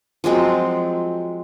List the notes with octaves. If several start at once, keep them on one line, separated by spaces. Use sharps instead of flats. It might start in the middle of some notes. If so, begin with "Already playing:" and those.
F3 F#3 G#3 C4